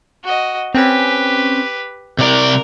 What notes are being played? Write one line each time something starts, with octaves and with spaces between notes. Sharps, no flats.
F#4 D#5
C4 C#4 G4 B4
C3 A#4 D5 D7